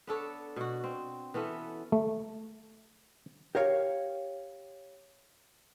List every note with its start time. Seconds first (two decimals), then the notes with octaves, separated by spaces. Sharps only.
0.07 B3 D4 A4 C#5
0.56 B2 F#4
0.84 C4
1.34 E3 B3 C#4 A4
1.92 A3
3.55 G4 A#4 C#5 F5